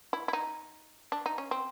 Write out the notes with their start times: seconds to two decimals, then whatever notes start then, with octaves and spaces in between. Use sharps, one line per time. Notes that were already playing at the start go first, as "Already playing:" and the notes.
0.13 E4
0.28 E4
0.33 D#4
1.12 D4
1.26 D#4
1.38 C#4
1.51 C4